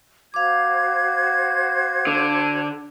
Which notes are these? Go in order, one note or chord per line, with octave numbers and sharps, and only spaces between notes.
F#4 C5 F5 D6 G#6
D3